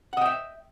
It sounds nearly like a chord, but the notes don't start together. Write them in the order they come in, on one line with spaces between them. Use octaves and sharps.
F#5 D#5 G5 E5